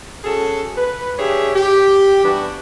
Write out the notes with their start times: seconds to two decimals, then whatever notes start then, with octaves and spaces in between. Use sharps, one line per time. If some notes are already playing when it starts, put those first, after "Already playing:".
0.24 C#4 F#4 G#4 A4
0.77 B4
1.19 D4 G4 G#4 C#5 E5
1.56 G4
2.23 E3 G3 B3 D4 F#4